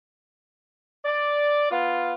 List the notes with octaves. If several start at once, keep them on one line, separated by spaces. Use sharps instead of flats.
D5
B3 F4